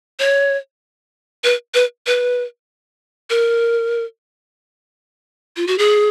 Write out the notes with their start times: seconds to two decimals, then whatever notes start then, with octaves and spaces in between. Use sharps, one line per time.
0.19 C#5
1.44 B4
1.74 B4
2.06 B4
3.30 A#4
5.56 F4
5.67 F#4
5.78 G#4